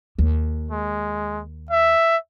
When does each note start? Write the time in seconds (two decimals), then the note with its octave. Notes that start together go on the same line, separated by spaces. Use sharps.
0.19 D#2
0.71 G#3
1.71 E5